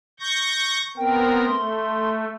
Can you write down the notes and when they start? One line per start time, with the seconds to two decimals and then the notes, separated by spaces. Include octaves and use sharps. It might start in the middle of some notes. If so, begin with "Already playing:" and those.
0.20 C#6 G6 A#6
0.97 B3 C4 A#4 G5
1.45 A3 C6